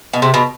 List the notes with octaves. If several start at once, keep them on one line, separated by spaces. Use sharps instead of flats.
B2
C3
B2